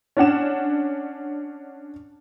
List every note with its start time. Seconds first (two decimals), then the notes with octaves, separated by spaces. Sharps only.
0.17 C#4 D4 F#5 E7